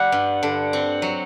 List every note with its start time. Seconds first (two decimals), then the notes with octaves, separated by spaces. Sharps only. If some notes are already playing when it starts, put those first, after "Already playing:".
Already playing: G3 F#5
0.12 G2
0.43 D3
0.73 C4
1.02 F#3